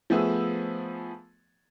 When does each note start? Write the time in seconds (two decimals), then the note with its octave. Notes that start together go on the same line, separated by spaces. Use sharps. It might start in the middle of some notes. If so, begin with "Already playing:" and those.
0.10 F3 A3 B3 G#4 E6